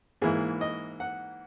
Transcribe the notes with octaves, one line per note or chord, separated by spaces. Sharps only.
G#2 E3 A#3 E4 G#4
D#5
F#5